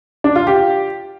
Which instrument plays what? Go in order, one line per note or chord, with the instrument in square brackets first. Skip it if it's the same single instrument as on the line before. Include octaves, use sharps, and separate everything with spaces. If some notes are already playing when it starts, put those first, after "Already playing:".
[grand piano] D4
F4
G4